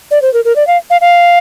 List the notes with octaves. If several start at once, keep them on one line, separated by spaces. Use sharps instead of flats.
D5
C5
A#4
A#4
D5
F5
F5
F5